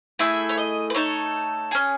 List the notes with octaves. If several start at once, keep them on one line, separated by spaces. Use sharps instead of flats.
A3 E4 G#4 E5
C#5
D#5
B4
A3 D#4 A4 C#5
C#4 G#4